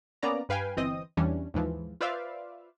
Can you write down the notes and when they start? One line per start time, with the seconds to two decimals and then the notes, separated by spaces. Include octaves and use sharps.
0.23 A#3 B3 C#4 D5 A#5
0.49 G2 B4 F5 G5 G#5
0.77 G1 E3 C4 D#5 D#6
1.17 E2 E3 G3 C#4 D4
1.54 D#2 G#2 E3 F3
2.01 F4 B4 C5 D5 E5 F5